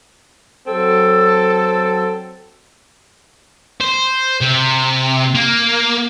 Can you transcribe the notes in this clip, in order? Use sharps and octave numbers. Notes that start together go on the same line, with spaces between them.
F#3 C4 A4
C5
C3
A#3